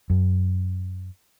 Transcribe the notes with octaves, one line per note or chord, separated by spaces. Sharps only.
F#2